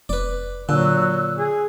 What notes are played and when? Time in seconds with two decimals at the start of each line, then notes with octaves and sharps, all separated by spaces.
0.09 F1 B4 D5
0.69 A#2 D3 F#3 E6 F#6
1.37 G#4